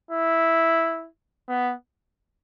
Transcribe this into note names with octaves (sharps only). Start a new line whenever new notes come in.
E4
B3